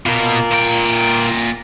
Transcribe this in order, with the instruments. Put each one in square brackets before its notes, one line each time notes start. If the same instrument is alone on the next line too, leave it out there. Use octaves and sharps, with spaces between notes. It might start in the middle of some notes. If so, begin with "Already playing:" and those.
[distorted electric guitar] B2 [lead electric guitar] F4 A#4
[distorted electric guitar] A#2 G5